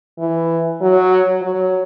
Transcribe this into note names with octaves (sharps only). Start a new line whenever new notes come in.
E3
F#3
F#3